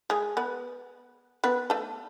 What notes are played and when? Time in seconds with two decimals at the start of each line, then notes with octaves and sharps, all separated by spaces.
0.10 G#3 G#4
0.37 B3 B4
1.44 B3 B4
1.70 A3 A4